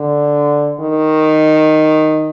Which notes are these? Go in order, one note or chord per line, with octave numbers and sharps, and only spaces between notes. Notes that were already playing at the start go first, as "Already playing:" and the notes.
Already playing: D3
D#3